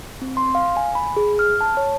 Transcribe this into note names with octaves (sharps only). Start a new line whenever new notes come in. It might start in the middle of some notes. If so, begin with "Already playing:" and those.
C4
C6
F5
G#5
B5
G#4
F6
A5
C#5